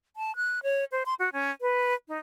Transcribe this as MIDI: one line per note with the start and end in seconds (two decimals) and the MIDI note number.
0.16 0.35 81
0.36 0.60 90
0.63 0.84 73
0.92 1.03 72
1.06 1.14 84
1.19 1.30 66
1.33 1.51 61
1.61 1.94 71
2.08 2.18 63